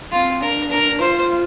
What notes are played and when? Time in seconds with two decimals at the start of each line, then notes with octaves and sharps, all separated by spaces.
0.12 C4 F4
0.41 D4 A#4
0.71 A#4
1.00 F4 C5